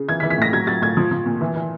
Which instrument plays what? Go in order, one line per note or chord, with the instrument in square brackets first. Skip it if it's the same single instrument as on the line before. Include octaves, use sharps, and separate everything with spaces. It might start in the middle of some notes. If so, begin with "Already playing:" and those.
Already playing: [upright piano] C#3
E3 G#6
E3 B6
B6
A2 A#6
F#3 G#6
F#3 A6
A2 G#6
F3
F3
A#2
E3
E3